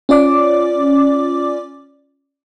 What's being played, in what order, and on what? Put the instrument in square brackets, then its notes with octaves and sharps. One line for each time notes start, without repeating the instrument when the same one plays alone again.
[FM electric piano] C#4 F4 D5 D6